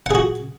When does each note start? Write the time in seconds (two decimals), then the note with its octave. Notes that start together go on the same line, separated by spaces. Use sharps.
0.06 F#5
0.11 G#4
0.15 F#4